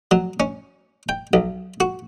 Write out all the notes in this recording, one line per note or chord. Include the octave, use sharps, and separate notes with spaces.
F#3
C#4
G5
B1
F#4